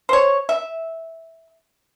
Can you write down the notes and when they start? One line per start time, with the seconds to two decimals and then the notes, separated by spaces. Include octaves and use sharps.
0.09 C5 C#5
0.49 E5